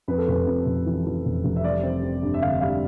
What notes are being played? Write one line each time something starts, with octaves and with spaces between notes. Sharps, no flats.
F2 B4
A4
F1 B4
F2
F1
E3
E3
F1
F1
E5
G3 D5
C4
C4
G2
E5
D3 F5
G3 F5